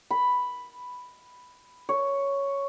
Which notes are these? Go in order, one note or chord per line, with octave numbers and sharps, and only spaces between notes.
B5
C#5